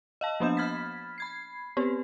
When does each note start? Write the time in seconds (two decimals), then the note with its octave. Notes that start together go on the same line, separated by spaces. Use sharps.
0.21 D#5 F5 A5
0.40 F3 A#3 B3 D4 G6 E7
0.57 B5 F6 G#6 A6 B6
1.18 B5 G#6 C7
1.77 B3 C4 G4 B4